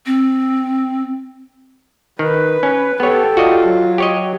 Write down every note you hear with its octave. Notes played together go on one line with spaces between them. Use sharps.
C4
D#3 B4
C#4
B3 G4 A4 C#5
F4 F#4 D5 D#5
F#3
G4 C#5 D#5